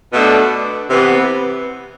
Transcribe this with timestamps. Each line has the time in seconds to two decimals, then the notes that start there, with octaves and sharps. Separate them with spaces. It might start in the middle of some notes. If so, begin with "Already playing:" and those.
0.13 B2 A3 D4
0.90 C3 E3 B3